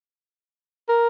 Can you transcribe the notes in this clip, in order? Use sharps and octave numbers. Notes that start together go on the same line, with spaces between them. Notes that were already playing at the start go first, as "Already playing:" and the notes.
A#4